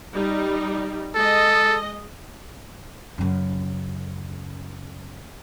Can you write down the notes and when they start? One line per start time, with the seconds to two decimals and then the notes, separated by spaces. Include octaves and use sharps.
0.14 G3 D#4
1.15 G#3 A4 D#5
3.18 F#2 C#3